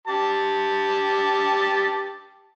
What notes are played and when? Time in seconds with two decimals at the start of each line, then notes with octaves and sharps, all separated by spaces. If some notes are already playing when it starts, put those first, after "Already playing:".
0.07 G4 A5